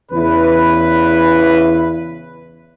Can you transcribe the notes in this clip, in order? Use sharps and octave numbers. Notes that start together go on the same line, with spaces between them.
E2 C#3 E4 B4